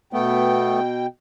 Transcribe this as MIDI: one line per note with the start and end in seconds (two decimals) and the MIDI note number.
0.13 1.07 47
0.13 0.80 57
0.13 0.80 59
0.13 1.07 79